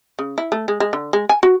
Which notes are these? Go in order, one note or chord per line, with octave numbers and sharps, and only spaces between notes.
C#3
E4
A3
G#3
G#3
D3
G#3
G#5
F#4